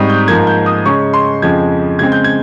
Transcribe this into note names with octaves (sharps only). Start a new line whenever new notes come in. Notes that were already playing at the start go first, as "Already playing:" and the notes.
Already playing: G#2 G3 C4 C#6 D#6
G6
G#2 F3 A#3 G#6
G6
D#6
C#3 G#3 C#4 C#6
C6
F2 C#3 F3 G#3 G#6
C#3 G#3 C4 G#6
G6
G#6